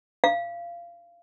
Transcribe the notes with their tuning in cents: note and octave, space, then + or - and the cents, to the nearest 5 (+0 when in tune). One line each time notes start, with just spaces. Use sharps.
F5 -20